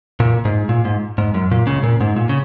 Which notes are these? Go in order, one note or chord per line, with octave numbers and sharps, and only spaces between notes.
A#2
G#2
A#2
G#2
G#2
F#2
A#2
C#2 C#3
A#2
G#2
A#2
C#3